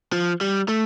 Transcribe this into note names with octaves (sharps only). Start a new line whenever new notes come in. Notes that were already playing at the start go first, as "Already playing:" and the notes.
F3
G3
A3